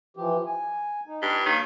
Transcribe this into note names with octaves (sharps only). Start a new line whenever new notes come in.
E3 F3 G4
G#5
D#4
G2
D#3 A#3 C#5